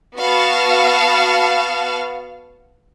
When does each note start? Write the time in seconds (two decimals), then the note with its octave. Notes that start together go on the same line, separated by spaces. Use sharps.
0.17 B3 F#4 F5 F#5 A5